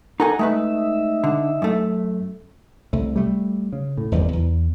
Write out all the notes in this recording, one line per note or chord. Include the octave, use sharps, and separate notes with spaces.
D#4 A4 A#4 F#5 G#5 A#5
G#3 A3 D#4 B4 E5
D3
F#2 A3
C2 A3
G3 A3
C#3
A2
F1 E2 D#3 G3
E2